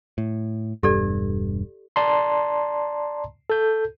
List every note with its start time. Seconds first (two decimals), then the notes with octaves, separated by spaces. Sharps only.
0.18 A2
0.83 E1 G2 G4 A4 D5
1.96 D5 A5 A#5 C6
3.50 A4 G6